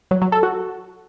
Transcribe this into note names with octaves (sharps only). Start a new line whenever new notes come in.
F#3
F#3
A4
F#4